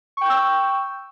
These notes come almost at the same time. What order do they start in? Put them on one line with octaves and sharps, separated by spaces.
C#6 G5 G6 E6